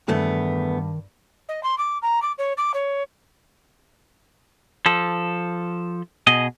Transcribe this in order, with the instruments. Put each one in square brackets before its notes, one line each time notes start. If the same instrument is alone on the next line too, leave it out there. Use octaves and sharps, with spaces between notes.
[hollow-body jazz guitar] E2 A3 B3 [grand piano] G2 [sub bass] D#3
[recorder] D#5
C6
D6
A#5
D6
C#5
D6
C#5
[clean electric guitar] F3 A4
B2 G#4 D#5